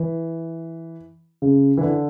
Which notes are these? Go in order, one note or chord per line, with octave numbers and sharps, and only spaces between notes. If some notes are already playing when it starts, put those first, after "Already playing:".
Already playing: E3
C#3
E3
D3